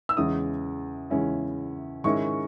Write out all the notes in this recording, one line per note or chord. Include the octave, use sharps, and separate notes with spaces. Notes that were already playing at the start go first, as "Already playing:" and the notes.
E6
E2 C#3 G#3 C#4 E4 D#6
E2 C#3 G#3 C#4 E4
G#2 D#3 G#3 C#4 E4 C#6